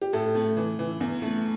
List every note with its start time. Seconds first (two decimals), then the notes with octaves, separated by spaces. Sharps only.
0.02 G4
0.13 A2 A4
0.35 A3
0.57 E3
0.79 E3
1.01 E2
1.22 A3